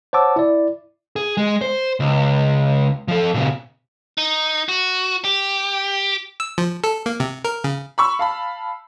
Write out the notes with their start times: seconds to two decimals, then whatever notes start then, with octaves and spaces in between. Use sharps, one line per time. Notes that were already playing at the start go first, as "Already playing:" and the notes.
0.13 C5 C#5 F#5 A5 D6 E6
0.36 E4 D5
1.16 G#4
1.37 G#3
1.61 C5
2.00 C#2
3.08 F3 A4
3.34 A#2 C#3
4.18 D#4
4.69 F#4
5.25 G4
6.40 E6
6.58 F3
6.84 A4
7.06 A#3
7.20 C3
7.45 A#4
7.64 C#3
7.98 B5 C#6 E6
8.19 F5 A5 B5